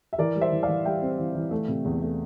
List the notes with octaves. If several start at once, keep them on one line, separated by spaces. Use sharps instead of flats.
E5
E3 A#4 D5
G3
C5 E5
E3
D5 F5
E3
G3 E5 G5
C4
E3
E3
A3
C3
E2
A3